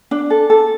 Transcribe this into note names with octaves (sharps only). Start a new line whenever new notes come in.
D4
A4
A4